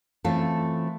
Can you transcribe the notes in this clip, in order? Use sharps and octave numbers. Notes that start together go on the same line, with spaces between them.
E3 A3 C4 C#4 F4 A4